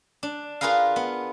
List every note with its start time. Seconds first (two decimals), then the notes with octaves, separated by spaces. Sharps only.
0.23 D4
0.61 F4 G#4 A#4 B4 F5
0.96 B3